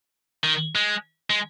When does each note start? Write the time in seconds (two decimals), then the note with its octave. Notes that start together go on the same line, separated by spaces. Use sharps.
0.44 D#3
0.75 G#3
1.30 G#3